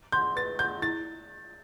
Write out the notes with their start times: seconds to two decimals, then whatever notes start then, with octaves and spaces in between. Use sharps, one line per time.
0.12 F#5 C6 G6
0.36 B4 A6
0.59 F#5 C6 G6
0.82 E4 A6